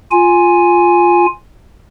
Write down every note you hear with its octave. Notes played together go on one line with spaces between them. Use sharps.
F4 G#5